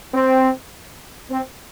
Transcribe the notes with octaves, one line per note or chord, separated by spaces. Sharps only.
C4
C4